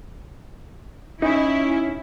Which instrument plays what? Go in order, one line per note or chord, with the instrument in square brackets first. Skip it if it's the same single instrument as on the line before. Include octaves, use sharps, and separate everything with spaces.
[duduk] C#4 [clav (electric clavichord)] D#4 [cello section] E4